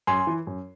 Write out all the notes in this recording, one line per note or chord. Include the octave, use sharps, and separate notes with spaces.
F#2 G#5 C6
E3
F#2